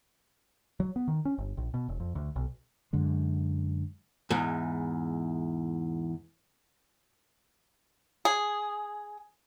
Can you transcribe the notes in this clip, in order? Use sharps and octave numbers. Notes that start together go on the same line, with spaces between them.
F#3
B3
D#3
C#4
G1
A#1
B2
E1
F2
D2
B1
F#2 D3 G#3
E2 G#2
G#4